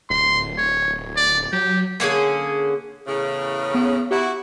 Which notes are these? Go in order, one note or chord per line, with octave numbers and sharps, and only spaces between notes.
D1 C6
C#5
D5
F#3 G4
D3 A#3 C#4 G#4
E2 A2 C#3
B3
E4 F#4 G4